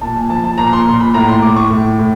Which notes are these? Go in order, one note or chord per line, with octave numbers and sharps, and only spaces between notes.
A#2 A5
G#5
F3 A5
A5
A#2 A#5
C6
A#2 C6
B5
A2 A#5
C6
A2 D6
C#6
A2
A2